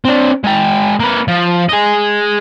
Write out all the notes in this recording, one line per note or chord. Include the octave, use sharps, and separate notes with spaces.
C4 D4
G#3 G5
A#3 B4
F3
G#4 D#5